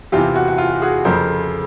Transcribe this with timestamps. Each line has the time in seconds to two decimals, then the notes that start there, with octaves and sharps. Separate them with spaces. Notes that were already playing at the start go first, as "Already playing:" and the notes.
0.12 E2 C3 E3 F4 G4
0.36 F#4
0.48 F#4
0.58 F4
0.70 F#4
0.82 F#4 G#4
1.05 F2 C#3 F3 A#4 C5